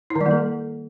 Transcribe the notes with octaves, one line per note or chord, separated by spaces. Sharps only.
E4
D#3
G3
A#3
A4